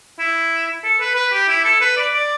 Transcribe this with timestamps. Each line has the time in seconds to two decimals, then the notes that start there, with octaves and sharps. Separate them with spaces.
0.19 E4
0.84 A4
1.01 B4
1.16 B4
1.33 G4
1.49 E4
1.65 A4
1.81 B4
1.97 D5
2.14 D5